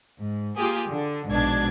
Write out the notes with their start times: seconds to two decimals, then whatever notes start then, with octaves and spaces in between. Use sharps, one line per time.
0.21 G#2
0.57 A#3 F4 G4 G#4
0.90 D3
1.28 A#1 G#2 B2 D4 G#6